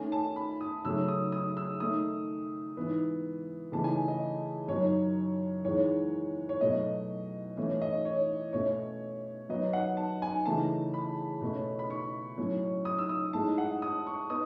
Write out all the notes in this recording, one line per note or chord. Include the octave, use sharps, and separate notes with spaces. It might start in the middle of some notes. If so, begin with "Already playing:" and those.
Already playing: D#3 A3 C#4 G#5
A5
B5
D#6
C#3 F#3 A3 E6
D#6
D#6
E6
D#3 A3 D#4 D#6
G#2 E3 B3
C#3 E3 A3 D#4 A5
G#5
D#5
F#2 D#3 F#3 C#5
E2 D#3 G#3 C#5
C#5
B2 F#3 A3 D#5
A2 E3 A3 C#4
D#5
C#5
B2 A3 C#4 C#5
D#3 F#3 B3 D#4 D#5
F#5
A5
G#5
C#3 E3 A3 D#4 A5
B5
B2 A3 C#4
B5
C#6
A2 F#3 C#4
D#6
E6
D#6
A2 G#3 D#4 A5
F#5
D#6
C#6
B3 D#4 D#6